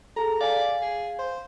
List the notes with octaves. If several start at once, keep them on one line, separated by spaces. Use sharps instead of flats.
G#4 A4 A#5
D5 F5 G#5
G#4
C5